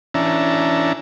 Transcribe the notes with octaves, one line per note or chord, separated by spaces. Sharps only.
E3 C#4 D4 E5 A5 A#5